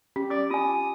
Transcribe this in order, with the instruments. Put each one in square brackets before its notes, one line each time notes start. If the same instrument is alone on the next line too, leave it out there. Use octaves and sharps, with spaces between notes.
[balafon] C#4 [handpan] G4
[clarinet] D5 [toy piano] D6
[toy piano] F4 G#5 [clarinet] D#6